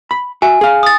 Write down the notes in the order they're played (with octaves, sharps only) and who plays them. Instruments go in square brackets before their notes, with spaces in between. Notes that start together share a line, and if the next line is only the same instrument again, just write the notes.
[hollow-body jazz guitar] B5
[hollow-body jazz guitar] F#4 E5 [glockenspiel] G#5
[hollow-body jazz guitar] G#4 F5
[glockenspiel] D#6 A6